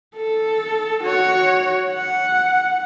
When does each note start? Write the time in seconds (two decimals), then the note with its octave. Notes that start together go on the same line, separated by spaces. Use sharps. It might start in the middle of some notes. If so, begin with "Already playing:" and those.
0.16 A4
1.03 F#4 C#5
1.90 F#5